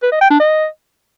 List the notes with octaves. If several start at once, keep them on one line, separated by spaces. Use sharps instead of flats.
B4
D#5
G5
D4
D#5